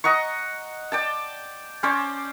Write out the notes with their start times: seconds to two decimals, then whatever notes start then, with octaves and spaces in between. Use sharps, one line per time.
0.04 D#5 F#5 A#5 C#6
0.92 D5 G5 A5
1.83 C#4 C5 D5